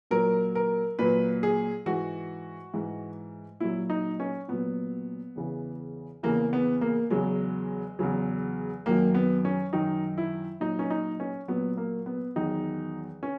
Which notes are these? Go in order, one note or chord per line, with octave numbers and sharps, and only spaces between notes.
A#2 F#3 A#4
A#4
A#2 F#3 B4
G#4
G#2 E3 F#4
G#2 E3
A#2 F#3 E4
D#4
C#4
A#2 F#3 B3
E2 C#3 E3
E2 C#3 E3 A#3
B3
A#3
E2 C#3 F#3 G#3
E2 C#3 F#3
F#2 D#3 F#3 A#3
B3
C#4
F#2 D#3 F#3 D#4
E4
A#2 F#3 D#4
C#4
D#4
C#4
A#2 F#3 B3
A#3
B3
E2 D#3 F#3 D#4
C#4